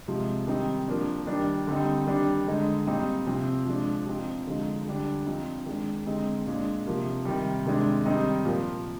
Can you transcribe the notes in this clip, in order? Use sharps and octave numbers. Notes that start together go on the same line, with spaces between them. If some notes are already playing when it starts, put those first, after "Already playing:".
C3 F3 G#3 D#4
D#3 G3 C4 D#4
F3 A#3 D4
D#3 G3 D4
D3 G3 C4 D#4
D#3 G3 D4
D3 G#3 D#4
A#2 G3 C4 D#4
C3 F3 C4
F3 G#3 D4
F3 C4 D#4
D3 F3 G#3 D#4
D3 G3 D4
F3 C4 D#4
D#3 G#3 D4
D3 G#3 C4 D#4
A#2 G#3 D4
C3 F3 A#3
C3 D#3 G3
C3 D#3 G#3 D4
D#3 G3 C4 D#4
A#2 F3 A#3